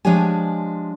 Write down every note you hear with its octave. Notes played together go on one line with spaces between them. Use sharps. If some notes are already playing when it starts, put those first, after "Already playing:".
F3 G#3 D4 G4 C#5 G#5